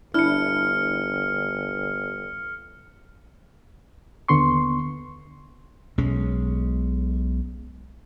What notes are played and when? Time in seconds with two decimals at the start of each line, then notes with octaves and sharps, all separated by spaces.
0.14 G1 D4 E4 F6 C#7
4.29 D#2 D3 B3 C6 C#6
5.98 B1 G#3 C#4